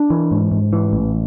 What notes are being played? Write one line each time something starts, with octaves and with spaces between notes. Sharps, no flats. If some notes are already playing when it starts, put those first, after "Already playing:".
Already playing: D4
E3
G#2
G#2
E3
A1